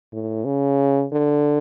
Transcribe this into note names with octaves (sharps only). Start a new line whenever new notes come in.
A2
C#3
D3